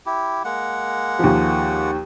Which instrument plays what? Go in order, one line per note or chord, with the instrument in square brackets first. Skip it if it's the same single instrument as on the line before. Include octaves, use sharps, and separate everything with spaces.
[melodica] E4 G4
G#3 A#3 F#5
[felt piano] D#2 F3